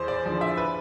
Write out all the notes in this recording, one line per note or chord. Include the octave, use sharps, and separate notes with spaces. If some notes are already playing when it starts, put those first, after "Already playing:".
Already playing: E2 C5
D5
D3 F3
E5
B4